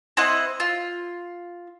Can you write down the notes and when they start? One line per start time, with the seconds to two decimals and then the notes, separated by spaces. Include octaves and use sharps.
0.17 C4 E4 D#5 F#5
0.60 F4